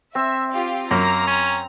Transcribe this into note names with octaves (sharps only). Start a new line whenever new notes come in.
C4 E5
F4 G4
F#2 A#3 A#5
C#4